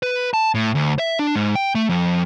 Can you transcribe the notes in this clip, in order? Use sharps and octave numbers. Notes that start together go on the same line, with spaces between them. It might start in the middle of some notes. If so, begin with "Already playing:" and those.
B4
A5
A2
D2
E5
D4
G#2
G5
A3
F2